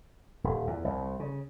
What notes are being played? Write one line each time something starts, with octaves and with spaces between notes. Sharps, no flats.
D#1
E2
C2
C#3